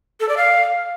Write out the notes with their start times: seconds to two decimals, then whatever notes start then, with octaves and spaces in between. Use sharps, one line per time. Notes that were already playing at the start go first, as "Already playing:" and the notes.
0.20 A4
0.29 D5
0.37 F5